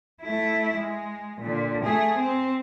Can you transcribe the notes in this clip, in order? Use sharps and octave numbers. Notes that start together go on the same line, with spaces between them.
A3 E4
G#3
A#2 D3
A3 G#4
C4